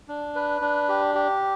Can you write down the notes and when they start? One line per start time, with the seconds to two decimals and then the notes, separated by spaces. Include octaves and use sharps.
0.08 D4
0.35 B4
0.61 D4
0.89 G4
1.15 G4